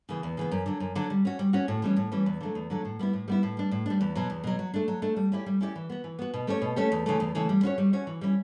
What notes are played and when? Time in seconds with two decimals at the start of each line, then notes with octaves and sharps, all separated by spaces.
0.09 C#3 E3 B3
0.23 E2
0.37 C#3 E3 B3
0.51 F#2
0.66 D3 F#3
0.80 F#2
0.95 D3 F#3
1.10 G3
1.25 C#4 F#4
1.39 G3
1.53 C#4 F#4
1.68 A2
1.82 E3 G3 C#4
1.96 A2
2.12 E3 G3 C#4
2.26 E2
2.41 D3 F#3 A3
2.55 E2
2.70 D3 F#3 A3
2.85 A2
2.99 G3 B3 E4
3.13 A2
3.28 G3 B3 E4
3.43 A2
3.57 G3 D4
3.71 A2
3.86 G3 D4
4.01 E2
4.15 B2 F#3
4.30 E2
4.44 B2 F#3
4.59 F#3
4.74 A3 D4
4.88 F#3
5.02 A3 D4
5.17 G3
5.32 C#4 E4 G4 D5
5.46 G3
5.61 C#4 E4 G4 D5
5.76 E3
5.89 B3 F#4
6.04 E3
6.19 B3 F#4
6.34 B2
6.47 A3 C#4 G4 C#5
6.62 B2
6.76 A3 C#4 G4 C#5
6.92 E2
7.06 C#3 E3 A3
7.20 E2
7.35 C#3 E3 A3
7.49 G3
7.63 C#4 F#4 C#5
7.78 G3
7.93 C#4 F#4 C#5
8.07 E3
8.21 G3 C#4 E4